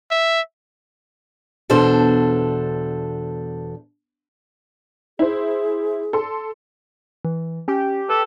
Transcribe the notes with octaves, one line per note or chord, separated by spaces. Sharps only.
E5
E2 B2 D4 A4 C5
E4 G#4 C5
A4 C6
E3
C#4 G4
A4 B4